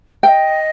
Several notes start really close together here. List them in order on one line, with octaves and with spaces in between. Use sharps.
F5 G5 D#5